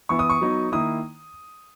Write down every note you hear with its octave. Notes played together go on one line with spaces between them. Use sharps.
E3 B3 E4 C#6
D#6
C#6
F#3 B3 D#4
D#3 A#3 E4 D#6